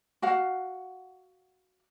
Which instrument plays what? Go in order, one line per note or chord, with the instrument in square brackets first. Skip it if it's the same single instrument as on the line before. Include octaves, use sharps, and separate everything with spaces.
[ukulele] F#4 F5 F#5